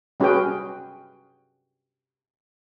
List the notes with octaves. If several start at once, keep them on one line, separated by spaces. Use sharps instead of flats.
G3 C#4 F#4 G#4 B4 G5